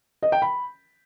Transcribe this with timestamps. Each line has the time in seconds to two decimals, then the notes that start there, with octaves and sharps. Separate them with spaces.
0.23 D#5
0.32 G5
0.42 B5